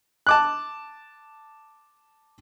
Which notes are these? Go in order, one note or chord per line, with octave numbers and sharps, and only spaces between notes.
A5 D6 F#6